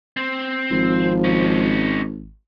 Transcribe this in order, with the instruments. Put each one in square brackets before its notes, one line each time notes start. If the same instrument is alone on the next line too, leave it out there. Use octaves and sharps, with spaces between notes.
[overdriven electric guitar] C4
[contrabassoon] G#1 [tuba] F3
[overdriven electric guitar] C#4 D#4